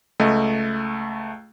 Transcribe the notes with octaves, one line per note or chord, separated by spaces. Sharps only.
C#2 A3 D#5